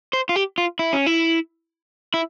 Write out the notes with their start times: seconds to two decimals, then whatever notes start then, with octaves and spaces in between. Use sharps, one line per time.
0.13 C5
0.29 F4
0.36 G4
0.58 F4
0.79 E4
0.93 C#4
1.06 E4
2.14 E4